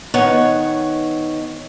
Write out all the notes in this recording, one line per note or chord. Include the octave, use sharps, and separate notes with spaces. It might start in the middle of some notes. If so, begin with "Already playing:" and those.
D#3 B3 C#5 F#5